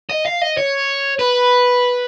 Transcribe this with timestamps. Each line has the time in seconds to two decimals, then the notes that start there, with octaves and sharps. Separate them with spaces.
0.10 D#5
0.26 F5
0.42 D#5
0.58 C#5
1.19 B4